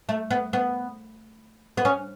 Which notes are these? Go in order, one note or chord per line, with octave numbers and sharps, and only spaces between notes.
A3
B3
B3
B3
C#4